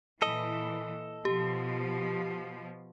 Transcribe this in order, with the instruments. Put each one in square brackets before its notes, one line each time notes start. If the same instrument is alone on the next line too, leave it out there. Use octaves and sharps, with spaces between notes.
[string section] A#2 E3 [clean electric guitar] A4 D#5
[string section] B2 F3 [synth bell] G4